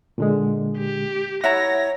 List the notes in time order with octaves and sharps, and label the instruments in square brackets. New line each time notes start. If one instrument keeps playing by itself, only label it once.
[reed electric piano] A#2 D3 G#3
[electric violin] G4
[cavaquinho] E4 [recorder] C#5 [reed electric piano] F#5 A#5 [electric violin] A#6